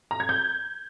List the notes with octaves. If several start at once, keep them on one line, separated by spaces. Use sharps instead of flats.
A#5
G#6
G6